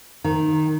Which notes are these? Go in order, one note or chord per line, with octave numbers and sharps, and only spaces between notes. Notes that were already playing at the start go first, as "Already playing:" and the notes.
D#3